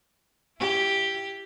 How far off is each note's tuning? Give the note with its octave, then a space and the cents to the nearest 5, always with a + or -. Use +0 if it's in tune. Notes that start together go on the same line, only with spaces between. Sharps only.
E4 +25 G4 +0